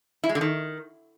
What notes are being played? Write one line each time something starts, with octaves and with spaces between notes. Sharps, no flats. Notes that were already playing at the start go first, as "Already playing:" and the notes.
E4
G#3
D3
D#3